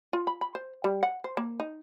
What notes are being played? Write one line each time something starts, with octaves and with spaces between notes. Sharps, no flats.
F4
B5
B5
C5
G3
F#5
C5
A#3
D#4